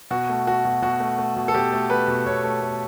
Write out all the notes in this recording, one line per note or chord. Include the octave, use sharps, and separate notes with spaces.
B2 F#4
A3
A3 F#4
B2
B2 F#4
A3
A3
B2
A4
B2 G4
A3
A3 B4
B2
B2 C#5
A3
A3